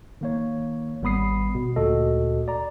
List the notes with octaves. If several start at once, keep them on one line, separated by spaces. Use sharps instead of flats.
D#3 A#3 C#5
G#1 G3 B3 B5 D#6 C7
B2
D2 A#2 F#4 A4 D#5
D5 A#5